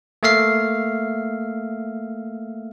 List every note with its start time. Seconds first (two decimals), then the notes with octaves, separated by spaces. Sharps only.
0.23 A3 A#3 E5 F5 C7